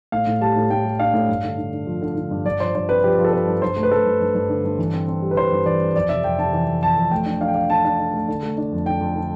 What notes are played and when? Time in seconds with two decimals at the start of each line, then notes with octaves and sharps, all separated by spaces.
0.12 A2 F5
0.27 A2
0.41 G3 A5
0.56 A2
0.70 A2 G5
0.85 G3
1.00 D4 F5
1.14 A2
1.29 G2
1.43 D3
1.58 D3
1.73 D3
1.87 F3
2.02 D3
2.16 D3
2.31 G2
2.45 G2 D5
2.60 F3 C5
2.75 G2 C5
2.89 C4 B4
3.04 F3 G4
3.18 F3
3.24 A4
3.33 C4 B4
3.47 G2
3.62 G2 C5
3.76 A3
3.83 B4
3.91 A3 A4
4.06 G2
4.21 G2
4.35 G2
4.49 D3
4.64 G2
4.79 E3
4.93 C4
5.08 C4
5.22 G3
5.31 B4
5.37 E3 C5
5.52 G2
5.66 E3 D5
5.80 C4
5.95 F2 D5
6.09 C3 E5
6.24 F2 G5
6.39 C3 A5
6.53 E3
6.68 F2
6.82 F2 A5
6.97 F2
7.11 A3 G5
7.26 D4
7.40 D4 F5
7.48 G5
7.55 A3 F5
7.70 D4 A5
7.84 D4
7.99 D4
8.13 A3
8.28 D3
8.43 A3
8.58 D4
8.72 F2
8.86 D4 G5
9.01 F2
9.16 D3